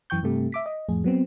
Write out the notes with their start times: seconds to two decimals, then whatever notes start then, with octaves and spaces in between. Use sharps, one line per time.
0.10 F#2 E3 G5 C#6 G6
0.23 G2 C3 A3 G4
0.52 E5 D6 B6
0.66 D#5
0.89 F2 A2 G#4
1.04 F#3 B3 C4